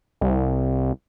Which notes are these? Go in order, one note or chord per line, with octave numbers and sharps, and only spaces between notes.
C2